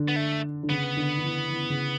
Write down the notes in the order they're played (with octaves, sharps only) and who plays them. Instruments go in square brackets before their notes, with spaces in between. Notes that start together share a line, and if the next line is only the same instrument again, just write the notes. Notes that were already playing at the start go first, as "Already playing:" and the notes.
Already playing: [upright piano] D3
[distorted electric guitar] B3
A3
[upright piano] D3
[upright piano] C#3 [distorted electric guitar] B3
[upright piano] D3
D3
E3
E3
C#3